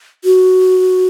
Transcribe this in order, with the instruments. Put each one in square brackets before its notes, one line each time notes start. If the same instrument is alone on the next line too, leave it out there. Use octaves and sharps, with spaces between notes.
[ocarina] F#4